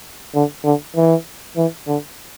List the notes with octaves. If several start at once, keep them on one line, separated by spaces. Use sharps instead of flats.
D3
D3
E3
E3
D3